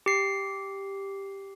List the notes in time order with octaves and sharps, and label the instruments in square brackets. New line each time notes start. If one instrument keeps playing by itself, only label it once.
[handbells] G4 C7